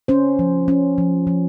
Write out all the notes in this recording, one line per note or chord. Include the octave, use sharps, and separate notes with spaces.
C#4 C5
F3
C#4
F3
F3